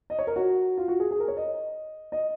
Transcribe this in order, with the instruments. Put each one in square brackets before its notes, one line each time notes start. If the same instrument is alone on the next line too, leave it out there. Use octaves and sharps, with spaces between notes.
[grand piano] D#5
C#5
A#4
F#4
F4
F#4
G#4
G#4
A#4
C#5
D#5
D#5